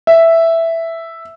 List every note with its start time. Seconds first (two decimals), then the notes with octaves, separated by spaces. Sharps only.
0.07 E5